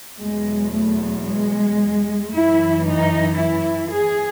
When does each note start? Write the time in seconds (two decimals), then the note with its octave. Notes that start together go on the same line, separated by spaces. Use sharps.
0.21 E2 B2 F#3 G#3
0.73 A3
1.26 G#3
2.32 F#2 E3 E4
2.85 D#4
3.37 E4
3.90 G#4